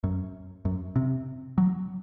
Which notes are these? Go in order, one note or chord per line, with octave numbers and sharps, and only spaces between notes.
F#2
F#2
C3
F#3